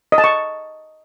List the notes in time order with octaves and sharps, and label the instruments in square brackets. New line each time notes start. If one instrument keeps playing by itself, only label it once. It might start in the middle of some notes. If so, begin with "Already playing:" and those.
[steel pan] D#5
A5
C#6